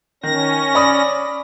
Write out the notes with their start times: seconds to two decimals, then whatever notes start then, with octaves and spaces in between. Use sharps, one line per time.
0.23 D#3 C#4 A#6
0.75 D5 B5 D#6